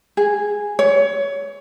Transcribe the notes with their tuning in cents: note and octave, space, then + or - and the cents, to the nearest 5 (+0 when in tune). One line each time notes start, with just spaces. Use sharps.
G#4 -5
C#5 +20